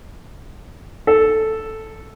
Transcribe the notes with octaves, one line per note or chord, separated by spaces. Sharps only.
A4